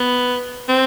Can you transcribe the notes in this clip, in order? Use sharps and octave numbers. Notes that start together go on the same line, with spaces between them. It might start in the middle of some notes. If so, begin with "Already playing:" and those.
Already playing: B3
C4